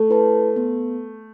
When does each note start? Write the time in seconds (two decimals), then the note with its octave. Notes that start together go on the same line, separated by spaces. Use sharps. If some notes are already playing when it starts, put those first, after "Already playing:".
Already playing: A3
0.10 E4 B4 A5
0.56 B3